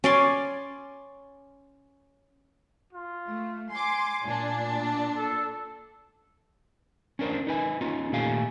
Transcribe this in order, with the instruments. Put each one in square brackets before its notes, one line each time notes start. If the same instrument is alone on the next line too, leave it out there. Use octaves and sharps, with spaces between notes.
[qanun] C#4 D5 C6
[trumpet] F4
[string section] A3
[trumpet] G#5 [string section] C6 D6
[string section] A#2 D4
[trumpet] A4
[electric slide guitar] C#4 D4 A#4 C5
D#4 B4 G#5
C#4 D#4 F4
A#2 D#3 A3 G4 F5 G#5